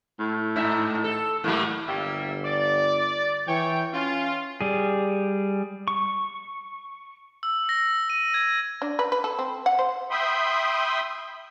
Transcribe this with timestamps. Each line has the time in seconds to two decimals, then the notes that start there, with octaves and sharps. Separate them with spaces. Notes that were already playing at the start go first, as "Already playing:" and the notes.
0.19 A2
0.56 G#2 D#4 E5
1.04 A4
1.44 A2 F#3 A3 A#3
1.87 G1 G3 A#3 E5
2.45 D5
3.48 E3 C#5 G5
3.94 C#4 F4
4.61 G3 G#4
5.88 C#6
7.43 E6
7.69 A#6
8.10 D#7
8.34 G#6
8.82 D4
8.99 B4
9.12 B4
9.24 A4
9.39 C4
9.66 F#5
9.79 C5
10.11 E5 G5 B5 C6 D#6